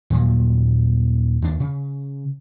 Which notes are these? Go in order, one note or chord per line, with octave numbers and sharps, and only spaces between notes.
D#2 A#2 F#3
D#2 D4
C#3